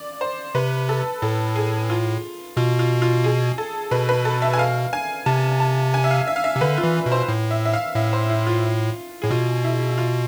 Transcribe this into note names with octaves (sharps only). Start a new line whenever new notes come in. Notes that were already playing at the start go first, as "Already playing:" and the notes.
Already playing: D5
C5
C3 B4
A4
A2 A4
G#4
F4
B2 F4
F4
F4
G#4
A4
B2 B4
B4
A4
E5
G#5
F5
G#5
C3 A5
A5
G#5
E5
F5
E5
F5
E5
C3
D3 B4
F4
E3
B2
C5
A2
E5
E5
F5
A2 E5
C5
E4
F4
A2 G#4
B2 F4
E4
F4